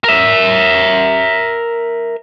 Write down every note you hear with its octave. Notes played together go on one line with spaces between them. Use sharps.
A#4 E5